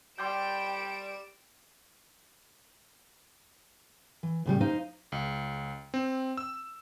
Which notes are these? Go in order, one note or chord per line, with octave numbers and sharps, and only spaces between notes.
G3 G5 C6 D6 G6 D7 E7
E3
A2 C#3 G3
D#4 C5 F5
C#2
C4
E6